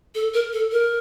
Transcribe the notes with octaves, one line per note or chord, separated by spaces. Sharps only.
A4
A#4
A4
A#4